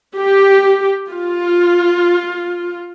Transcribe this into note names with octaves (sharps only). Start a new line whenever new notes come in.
G4
F4